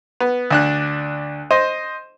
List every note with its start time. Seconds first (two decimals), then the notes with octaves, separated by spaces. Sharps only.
0.20 B3
0.50 D2 D4 F#6
1.51 C5 D#5